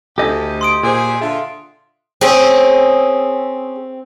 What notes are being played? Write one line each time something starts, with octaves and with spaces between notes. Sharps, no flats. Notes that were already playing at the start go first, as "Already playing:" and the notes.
D2 G4 A4 D#5 G#5 G6
C6 D#6 D7
A#2 G#4 C5
D3 F4 E5
C4 C#4 G#4